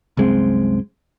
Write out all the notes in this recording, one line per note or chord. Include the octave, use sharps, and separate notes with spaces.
C2 F#2 G#3 C4